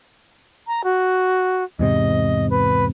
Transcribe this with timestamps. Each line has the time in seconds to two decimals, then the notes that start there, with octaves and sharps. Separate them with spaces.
0.67 A#5
0.84 F#4
1.79 E2 G#2 C3 D#5
2.50 B4